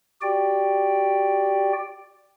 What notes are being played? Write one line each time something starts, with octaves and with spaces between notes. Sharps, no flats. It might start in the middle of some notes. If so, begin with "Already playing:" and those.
F#4 G4 D5 G5